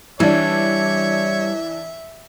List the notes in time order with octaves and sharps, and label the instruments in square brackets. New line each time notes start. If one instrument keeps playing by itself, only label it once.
[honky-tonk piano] E3 D4 [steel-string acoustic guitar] G3 [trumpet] C#5 [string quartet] E5